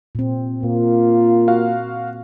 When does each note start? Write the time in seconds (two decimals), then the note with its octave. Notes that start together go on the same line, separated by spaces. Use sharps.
0.15 A#2 C4
0.63 A#2 A#3 F4
1.48 F#4 F5